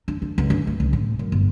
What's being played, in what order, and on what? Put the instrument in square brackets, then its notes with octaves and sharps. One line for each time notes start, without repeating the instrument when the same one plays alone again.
[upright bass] D4
D4
C#2
D4
A3
C#2
A2
F#2
G1